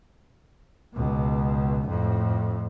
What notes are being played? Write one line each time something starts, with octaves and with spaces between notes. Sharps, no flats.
C#2 B2
F2 A2